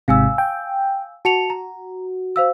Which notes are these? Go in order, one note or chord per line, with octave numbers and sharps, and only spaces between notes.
G#1 G#2 C3 F5 G#5 E6
G5
F#4 A5 C#7 F7
A#5
C5 F5 E6